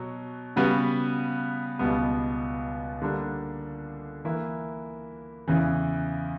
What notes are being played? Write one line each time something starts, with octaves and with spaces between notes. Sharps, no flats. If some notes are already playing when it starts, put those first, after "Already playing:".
Already playing: B2 F#3
C#3 G3 B3 F#4 B4
C#2 B2 G3 B3
D3 G3 A#3 D4
E3 A#3 E4
E2 C#3 E3